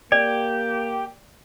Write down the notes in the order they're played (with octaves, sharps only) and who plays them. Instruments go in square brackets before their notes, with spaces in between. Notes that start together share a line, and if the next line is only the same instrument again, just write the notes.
[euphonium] A#3 [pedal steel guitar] G4 [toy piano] D5